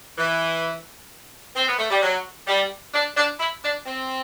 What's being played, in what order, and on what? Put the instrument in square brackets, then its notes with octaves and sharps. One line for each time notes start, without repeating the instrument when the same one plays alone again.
[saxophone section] E3
C4
B3
A3
G3
F#3
G3
D4
D4
E4
D4
C4